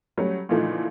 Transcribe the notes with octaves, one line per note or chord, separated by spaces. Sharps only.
F#3 G3 A3 C#4
A#2 D3 E3 F3 A3 D#4